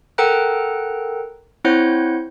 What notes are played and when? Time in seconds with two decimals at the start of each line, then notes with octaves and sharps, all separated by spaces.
0.18 A4 A#4 F#5 G5 A#5 F#6
1.64 C4 E4 C5 C#5 F#5 G6